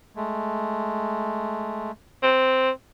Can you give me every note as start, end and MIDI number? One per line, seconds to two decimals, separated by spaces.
0.16 1.91 56
0.16 1.91 57
2.23 2.70 60